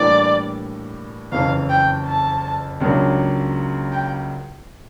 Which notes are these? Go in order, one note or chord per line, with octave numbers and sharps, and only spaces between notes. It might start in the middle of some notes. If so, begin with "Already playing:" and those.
Already playing: A2 E3 G3 A#3 D4 D5
F#1 F2 C#3 E3 F5
G5
A5
C#2 C#3 F#3 A#3 D4
G5